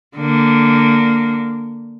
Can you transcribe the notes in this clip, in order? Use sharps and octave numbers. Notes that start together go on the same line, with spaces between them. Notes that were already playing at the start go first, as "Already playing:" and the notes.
D3 A#3